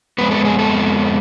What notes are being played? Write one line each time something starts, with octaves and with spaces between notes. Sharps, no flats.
F2 C#3 G#3 B3 B4
A4
G#4
A4